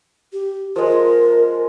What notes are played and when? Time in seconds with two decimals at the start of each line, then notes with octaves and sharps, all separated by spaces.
0.33 G4
0.76 F3 G#3 A#4